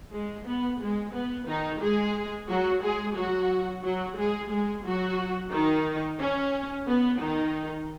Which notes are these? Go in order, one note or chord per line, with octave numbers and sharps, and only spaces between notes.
G#3
B3
G#3
B3
D#3 D#4
G#3 G#4
F#3 F#4
G#3 G#4
F#3 F#4
F#3 F#4
G#3 G#4
G#3 G#4
F#3 F#4
D#3 D#4
C#4
B3
D#3 D#4